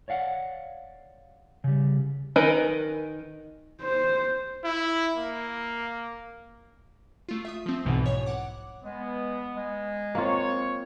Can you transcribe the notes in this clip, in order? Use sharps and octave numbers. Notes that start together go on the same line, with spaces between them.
C#5 D5 F5 F#5
C#3 G3
D#3 A#4 B4 D#5 G#5
C5
E4
A#3
A3 F4
E5 D#6
F3 C4
B1 G#2 B2 E3
C#5
F#5 D6
G#3 B3
G#3
A#3 C4 F4 C#5